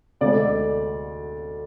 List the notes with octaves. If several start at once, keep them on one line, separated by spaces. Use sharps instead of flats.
D2 D3 G#3 D5